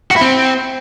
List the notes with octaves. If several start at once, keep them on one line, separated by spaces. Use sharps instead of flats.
F#4
E4
C4